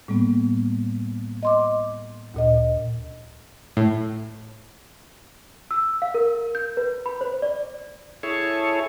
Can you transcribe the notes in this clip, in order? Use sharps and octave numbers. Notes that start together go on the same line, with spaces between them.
A2 G3 A#3 B3
D#5 C6 D6
D2 A#2 D#5
A2
E6
F5
A#4
G6
B4
B5
C5
D5
E4 G#4 A4 C#5